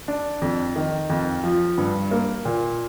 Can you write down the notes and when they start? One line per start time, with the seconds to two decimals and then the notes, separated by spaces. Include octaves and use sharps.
0.08 D4
0.42 F2
0.76 D#3
1.10 F2
1.44 F3
1.78 G2
2.11 A#3
2.45 A#2